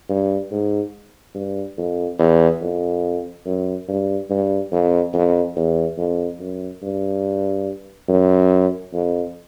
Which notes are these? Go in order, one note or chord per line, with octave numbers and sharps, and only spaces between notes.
G2
G#2
G2
F2
E2
F2
F#2
G2
G2
F2
F2
E2
F2
F#2
G2
F#2
F2